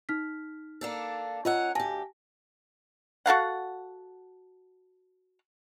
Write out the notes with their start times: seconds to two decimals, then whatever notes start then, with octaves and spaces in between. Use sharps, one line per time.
0.09 D#4 F6 B6
0.81 A#3 D4 A4
1.45 C#4 F4 A#4 D#5 F#5 E6
1.75 D2 G4 G#5 A5 A#6
3.26 F#4 A4 F5 F#5